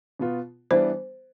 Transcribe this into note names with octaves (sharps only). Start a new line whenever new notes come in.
B2 B3 F4
E3 G3 B3 D4 C5